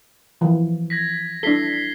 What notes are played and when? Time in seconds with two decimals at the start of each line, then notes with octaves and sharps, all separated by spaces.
0.41 E3 F3
0.90 G#6 A#6 B6
1.43 D4 E4 A4 B6 C7 G7